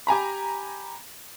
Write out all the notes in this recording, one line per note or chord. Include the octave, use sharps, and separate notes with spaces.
G4 G#5 A#5 B5